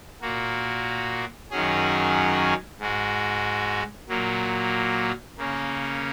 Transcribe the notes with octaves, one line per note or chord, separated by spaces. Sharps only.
A#2 A#3 F#4
F#2 D#3 F#3 C#4 G#4
G#2 G#3 F#4
A#2 F#3 A#3
C#3 A#3 C#4